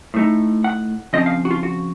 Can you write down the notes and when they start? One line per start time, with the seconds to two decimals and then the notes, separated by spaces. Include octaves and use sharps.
0.14 A2 A3 D#4
0.64 F#5
1.13 C#3 F3 C4 F4 D#5
1.26 F5
1.45 F#4
1.51 F4
1.63 F#4